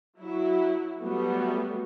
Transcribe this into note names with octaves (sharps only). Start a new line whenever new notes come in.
F#3 E4
F#3 G3 A3 B3 F#4